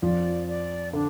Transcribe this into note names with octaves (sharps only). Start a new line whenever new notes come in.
F2 F3 D5
D5
D3 D4